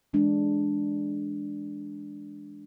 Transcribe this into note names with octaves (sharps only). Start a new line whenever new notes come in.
E3 G#3 D4